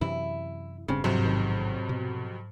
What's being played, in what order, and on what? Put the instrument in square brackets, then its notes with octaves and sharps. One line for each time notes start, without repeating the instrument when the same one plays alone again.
[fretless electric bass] F#2 C3 E3 [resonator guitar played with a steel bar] E4
[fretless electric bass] E1 G2 C4 [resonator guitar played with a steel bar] C#3
[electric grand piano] F2 F#3 C5 [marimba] G#2 [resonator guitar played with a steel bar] C3
[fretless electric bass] A1 D#3
B2